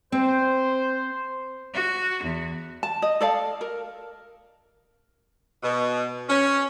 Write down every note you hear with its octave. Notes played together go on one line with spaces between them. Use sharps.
C4 C5
F#4
E2
A5
D#5
A4 D5 F5 A5
A#4
B2
C#4